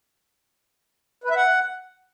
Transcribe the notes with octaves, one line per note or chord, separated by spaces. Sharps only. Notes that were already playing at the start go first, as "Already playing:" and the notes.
B4
E5
F#5